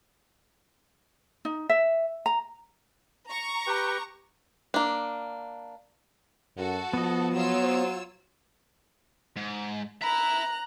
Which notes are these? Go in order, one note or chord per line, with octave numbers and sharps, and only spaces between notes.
D#4
E5
A#5
A#5 C#6
G4 B4 G5
A#3 D4
F#2 F#4 A4
F3 B3 D#5
F#3 F4 C#5 E6
C5
G#2
E5 A#5 B5 F#6